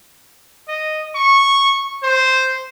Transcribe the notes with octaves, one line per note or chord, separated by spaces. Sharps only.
D#5
C#6
C5